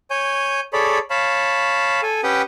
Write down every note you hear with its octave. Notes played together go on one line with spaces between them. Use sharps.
C#5 G#5 G6
G#4 A4 C#5 D5 B5
C#5 F5 A5 B5
A4 G#5
C#4 G4 B4 F#5 G5 D#6